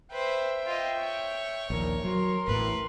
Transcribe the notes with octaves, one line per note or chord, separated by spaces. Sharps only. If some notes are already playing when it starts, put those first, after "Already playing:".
B4 C5 E5 G5
F4 D#5
C#5 C#6
A#1 D#2 A#4
F#3 A#4 C6
A1 E2 A2 B4